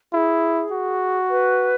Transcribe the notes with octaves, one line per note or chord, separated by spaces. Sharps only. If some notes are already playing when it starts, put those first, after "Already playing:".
E4 G#4
F#4
B4